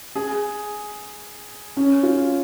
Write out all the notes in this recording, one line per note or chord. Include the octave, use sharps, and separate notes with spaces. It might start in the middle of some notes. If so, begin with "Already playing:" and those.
G#4
C#4
F4